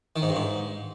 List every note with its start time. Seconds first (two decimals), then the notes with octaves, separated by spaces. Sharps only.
0.16 D#3
0.22 G#2
0.29 G2
0.36 G#2